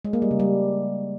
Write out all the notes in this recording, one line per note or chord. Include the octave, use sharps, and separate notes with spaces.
G#3
A#3
G3
C#3
G3